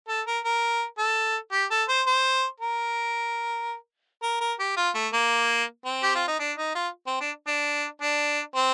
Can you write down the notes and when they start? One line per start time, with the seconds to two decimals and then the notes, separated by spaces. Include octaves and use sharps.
0.08 A4
0.27 A#4
0.45 A#4
0.98 A4
1.52 G4
1.71 A4
1.89 C5
2.07 C5
2.61 A#4
4.23 A#4
4.41 A#4
4.59 G4
4.77 F4
4.95 A3
5.13 A#3
5.85 C4
6.03 G4
6.15 F4
6.28 D#4
6.40 D4
6.57 D#4
6.75 F4
7.07 C4
7.21 D4
7.47 D4
8.02 D4
8.56 C4